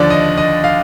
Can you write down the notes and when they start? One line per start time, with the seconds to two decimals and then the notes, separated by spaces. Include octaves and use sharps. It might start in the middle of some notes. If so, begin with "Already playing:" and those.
Already playing: D#2 D3 F3 D5
0.10 D#5
0.38 D#5
0.64 F5